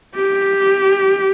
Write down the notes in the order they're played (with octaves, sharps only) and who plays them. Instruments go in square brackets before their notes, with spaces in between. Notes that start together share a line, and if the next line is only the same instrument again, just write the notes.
[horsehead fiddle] G4